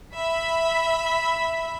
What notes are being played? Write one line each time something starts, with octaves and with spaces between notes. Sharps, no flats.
E5 B5 B6